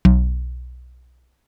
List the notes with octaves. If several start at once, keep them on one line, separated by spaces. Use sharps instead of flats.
B1